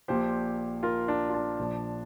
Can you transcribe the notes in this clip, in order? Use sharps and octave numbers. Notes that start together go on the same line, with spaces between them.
A#1 A#2 F3 G4 C5
F4 A#4
D4
F4
D4
A#1 A#2 F3